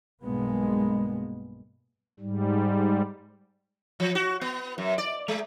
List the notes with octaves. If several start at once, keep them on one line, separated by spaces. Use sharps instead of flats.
B1 G2 B2 G#3 A#3 B3
G#2 G3
F3
F#4
B3
F#2
D5
G#3